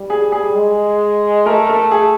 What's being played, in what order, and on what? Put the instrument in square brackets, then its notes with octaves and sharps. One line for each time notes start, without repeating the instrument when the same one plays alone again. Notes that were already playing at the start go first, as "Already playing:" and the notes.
Already playing: [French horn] G3
[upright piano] G#4
G#4
[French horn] G#3
[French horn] A3 [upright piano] A#4
[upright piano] A4
G#4